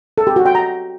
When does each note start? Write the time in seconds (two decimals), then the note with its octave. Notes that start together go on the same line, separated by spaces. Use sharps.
0.18 A4
0.27 G4
0.36 F#4
0.46 G5
0.55 A#5